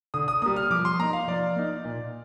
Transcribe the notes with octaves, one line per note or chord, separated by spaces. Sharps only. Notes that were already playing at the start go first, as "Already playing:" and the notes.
D3 D#6
D#6
G3 A#3 D#6
F6
F3 D6
C6
A#3 D#4 A#5
F5
F3 D5
A#3 D#4
A#2